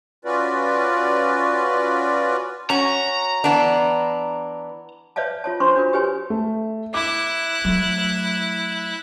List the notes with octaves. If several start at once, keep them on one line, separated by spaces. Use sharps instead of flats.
C#4 F4 F#4 B4 D5
C#4 F#4 A#5
E3 B3 D4
B4 C#5 D5 E5 F5 A5
F4 C#5 A5
D4 C5 C6 C#6
D4 F4 F#4 A#4
G4 B4 C#5 G#5
A3
E4 D6 F#6
F#3 A3